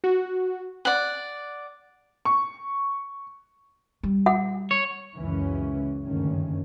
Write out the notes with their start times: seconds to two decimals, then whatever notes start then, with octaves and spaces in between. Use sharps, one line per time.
0.04 F#4
0.85 D5 F#5
2.25 C#6
4.03 G3
4.26 F#5
4.71 C#5
5.18 C#2 F#2 E3 C#4
6.05 F#1 D2 G2 D#3 C#4